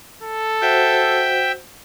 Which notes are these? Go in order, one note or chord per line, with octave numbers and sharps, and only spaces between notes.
A4
F#4 C5 E5 F#5 G5